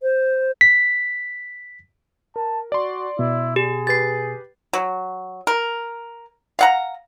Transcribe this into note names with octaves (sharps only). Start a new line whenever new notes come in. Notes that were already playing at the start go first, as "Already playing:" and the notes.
C5
B6
A#4 A5
F#4 D5 C6
B2 E4
G4 G#4
G4 B4 A6 C7
F#3
A#4
F5 F#5 A#5